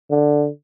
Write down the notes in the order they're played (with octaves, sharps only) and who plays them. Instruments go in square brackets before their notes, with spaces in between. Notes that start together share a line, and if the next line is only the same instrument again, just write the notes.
[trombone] D3